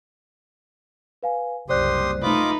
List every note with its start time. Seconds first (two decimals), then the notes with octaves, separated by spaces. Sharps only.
1.23 B4 F5 G#5
1.69 F#1 C2 G4 C5 D5 C6 D#6 F#6
2.23 A3 D#4 F4 B4 D#5 D6